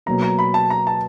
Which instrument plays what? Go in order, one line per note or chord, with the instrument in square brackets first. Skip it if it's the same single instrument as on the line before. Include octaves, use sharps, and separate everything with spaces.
[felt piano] B2 F#3 A#3 [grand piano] A#5
[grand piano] A#5
B5
A5
A#5
A5